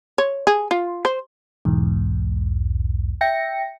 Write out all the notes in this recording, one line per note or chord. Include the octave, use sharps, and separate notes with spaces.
C#5
G#4
F4
C5
B1 E2 G#2
E5 G5 A#6 C#7